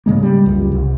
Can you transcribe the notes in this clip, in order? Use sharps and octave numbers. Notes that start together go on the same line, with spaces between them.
G#2 C#3 G#3 A#3
G3
C#2 F#2
C2